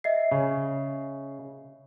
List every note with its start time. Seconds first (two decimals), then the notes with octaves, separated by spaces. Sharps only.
0.04 D#5 E5 C7
0.32 C#3